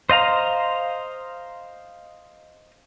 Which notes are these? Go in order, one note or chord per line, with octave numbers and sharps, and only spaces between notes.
C5 D#5 F5 A#5